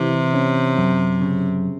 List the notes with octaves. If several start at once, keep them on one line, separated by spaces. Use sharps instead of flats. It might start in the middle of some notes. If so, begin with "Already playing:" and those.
Already playing: C3 E3
C#4
F#2
C#3